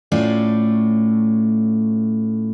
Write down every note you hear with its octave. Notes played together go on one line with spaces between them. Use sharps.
A2 A3 C#4 F4 A4 D5